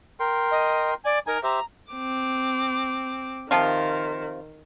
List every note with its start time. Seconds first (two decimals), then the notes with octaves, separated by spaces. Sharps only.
0.20 A#4 G5 C6
0.50 D#5
1.04 D5 G#5
1.27 D#4 A#4 G#5
1.43 G4 C5 E5 A#5
1.92 C4 D6
3.51 C3 D#3 F3 F4